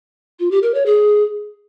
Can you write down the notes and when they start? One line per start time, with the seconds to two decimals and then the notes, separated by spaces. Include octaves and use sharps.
0.39 F4
0.51 G4
0.63 A#4
0.74 C#5
0.86 G#4